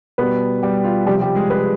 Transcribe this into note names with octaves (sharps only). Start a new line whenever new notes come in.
B2 G3 B3 B4
G3 G4
F4
C3 F3 G3 G4
G3 G4
G#3 G#4
B4
G#4